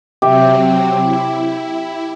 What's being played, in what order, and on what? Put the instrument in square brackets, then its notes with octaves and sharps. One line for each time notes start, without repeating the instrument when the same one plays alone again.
[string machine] C3 F#3 C4 [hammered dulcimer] G4 E5
[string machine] E4